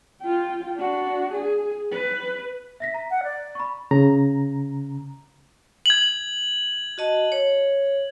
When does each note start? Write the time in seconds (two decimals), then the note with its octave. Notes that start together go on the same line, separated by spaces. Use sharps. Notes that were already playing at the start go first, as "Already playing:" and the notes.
0.21 F4 G5
0.77 D4 F#4
1.33 G#4
1.91 B4
2.80 E5 A#6 B6
2.94 A#5
3.11 F#5
3.23 D5
3.55 B5 C#6
3.91 C#3 A#5
5.86 G#6 F#7
6.98 F#4 D#5 A5
7.32 C#5